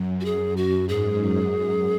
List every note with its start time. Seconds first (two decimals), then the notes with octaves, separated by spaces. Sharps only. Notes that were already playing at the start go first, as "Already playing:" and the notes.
Already playing: F#2
0.21 F#4
0.25 G#4
0.57 F#4
0.88 G#2 G#4
1.20 F#2
1.53 F#2